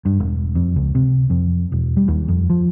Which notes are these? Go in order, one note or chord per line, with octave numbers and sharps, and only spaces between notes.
G2
E1
F2
C#2
C3
F2
E1
G3
D#2
F2
F3